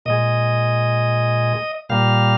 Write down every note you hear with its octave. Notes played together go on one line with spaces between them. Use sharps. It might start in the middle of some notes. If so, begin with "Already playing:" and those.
A#2 G#3 D#5
A#2 G3 A#3 F5